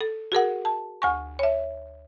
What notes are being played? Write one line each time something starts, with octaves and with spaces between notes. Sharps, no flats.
A4
F#4 G#4 A#4 F#5
A5
D2 G#5 C#6
C#5 E5